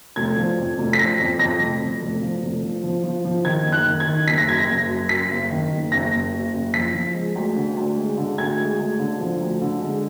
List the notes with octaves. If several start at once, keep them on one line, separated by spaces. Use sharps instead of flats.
F1 G#6
F3
F2
F1
B6
F3 A#6
F2
F2 A#6
F1
F2
F1
F3
F1
F3
F3
F3
F3
D#3 G#6
F#1
F#6
D#3
G#6
D#3
F#1 B6
A#6
F#2 G#6
A#6
F#1
F#2
F#2 B6
F#1
D#3
F#1
F#1 A#6
F#1
F#1
F#1
F3 B6
F3
G#3
D2
D3
D2
G#3
D3
D2 G#6
G#3
D2
D3
F3
D2
D3
G#3